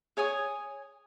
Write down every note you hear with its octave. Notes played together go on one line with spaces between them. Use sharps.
G#4 C#5 G#5 D#6